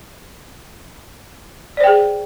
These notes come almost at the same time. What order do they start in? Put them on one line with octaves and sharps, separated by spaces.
D5 C5 G5 G#4